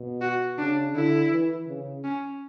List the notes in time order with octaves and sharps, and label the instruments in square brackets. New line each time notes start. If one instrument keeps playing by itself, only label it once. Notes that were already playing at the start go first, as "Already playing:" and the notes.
Already playing: [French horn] B2
[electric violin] F#4
[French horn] C#3 [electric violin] D4
[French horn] D3 [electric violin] E4
[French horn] E3
C#3
[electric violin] C#4